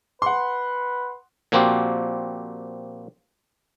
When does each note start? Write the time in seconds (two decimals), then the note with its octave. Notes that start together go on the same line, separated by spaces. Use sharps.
0.22 B4 F#5 C6
1.52 A#2 F3 A#3 C4 F#4 G4